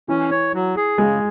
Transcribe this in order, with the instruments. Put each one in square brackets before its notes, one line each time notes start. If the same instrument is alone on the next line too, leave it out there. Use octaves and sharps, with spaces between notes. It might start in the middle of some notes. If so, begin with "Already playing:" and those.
[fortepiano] E3 [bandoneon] C#4
[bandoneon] C#5
F#3
G#4
[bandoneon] C#3 [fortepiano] G#3